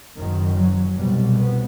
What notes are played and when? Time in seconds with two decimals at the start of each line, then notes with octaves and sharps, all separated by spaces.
0.17 F#1 F#2 D#3
0.57 F#3
0.96 C2 B2 G3
1.37 B3